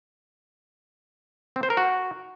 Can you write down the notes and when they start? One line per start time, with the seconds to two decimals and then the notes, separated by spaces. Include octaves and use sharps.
1.56 C4
1.63 C5
1.70 A#4
1.77 F#4